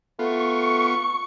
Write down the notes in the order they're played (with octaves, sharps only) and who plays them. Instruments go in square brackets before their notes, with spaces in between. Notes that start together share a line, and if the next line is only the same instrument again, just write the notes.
[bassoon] A3 [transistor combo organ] B3 F4 [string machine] C#6